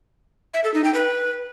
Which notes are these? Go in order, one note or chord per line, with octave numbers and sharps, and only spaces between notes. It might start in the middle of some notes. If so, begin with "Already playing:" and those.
E5
A4
D#4
G5
B4